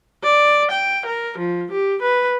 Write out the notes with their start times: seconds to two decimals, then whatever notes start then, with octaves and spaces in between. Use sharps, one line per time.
0.23 D5
0.71 G5
1.06 A#4
1.38 F3
1.72 G4
2.02 B4